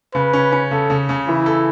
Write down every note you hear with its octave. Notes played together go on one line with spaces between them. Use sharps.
C#3 B4
C#4
C#4
C#3 A4
C#3
C#3
E3 E4
A4